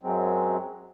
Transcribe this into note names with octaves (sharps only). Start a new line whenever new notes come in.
F#2 F#3 G#3 C4